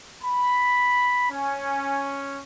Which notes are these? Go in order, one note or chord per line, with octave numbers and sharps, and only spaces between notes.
B5
C#4